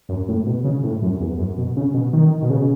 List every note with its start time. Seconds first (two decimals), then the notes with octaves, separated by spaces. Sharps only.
0.09 F#2
0.28 A2
0.46 B2
0.64 C#3
0.84 A2
1.02 F#2
1.20 E2
1.38 F#2
1.58 B2
1.76 C#3
1.94 B2
2.13 D#3
2.42 B2
2.50 C#3